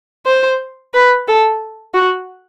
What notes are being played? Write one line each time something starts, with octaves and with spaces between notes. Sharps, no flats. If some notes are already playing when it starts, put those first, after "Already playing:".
C5
B4
A4
F#4